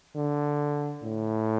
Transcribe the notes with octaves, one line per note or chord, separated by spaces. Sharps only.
D3
A2